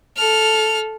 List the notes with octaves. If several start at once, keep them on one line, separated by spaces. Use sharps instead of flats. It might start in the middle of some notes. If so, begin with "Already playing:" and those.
A4 F6